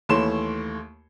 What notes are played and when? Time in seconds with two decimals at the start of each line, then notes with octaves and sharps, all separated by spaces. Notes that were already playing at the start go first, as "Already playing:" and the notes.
0.09 D#2 E3 A3 C#5 C6 E7